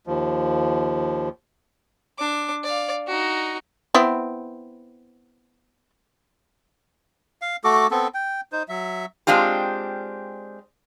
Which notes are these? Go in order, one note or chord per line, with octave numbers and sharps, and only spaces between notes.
D#2 F3
D4 D6
D5 F5
D#4 F#4
B3 C4 E4
F5
A3 F#4 A4 D6
B3 C4 A4
G5
D#4 C5
F#3 E5
G#3 C4 D4 F4 G4